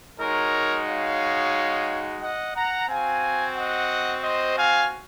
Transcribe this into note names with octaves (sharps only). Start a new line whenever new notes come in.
G#3 D#4 F#4 A#4 C#5
C#5 F5
D#5 F#5
F#5 A#5
C4 F#4 F5 G#5
D#5 F#5
C5 D#5
F5 G#5